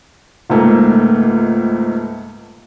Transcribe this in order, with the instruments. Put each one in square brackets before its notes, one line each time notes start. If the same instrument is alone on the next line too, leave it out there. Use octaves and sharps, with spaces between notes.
[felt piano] C#2 G#2 A3 A#3